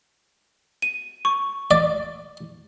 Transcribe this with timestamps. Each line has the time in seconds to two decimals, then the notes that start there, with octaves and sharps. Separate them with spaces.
0.82 D#7
1.25 C#6
1.71 D5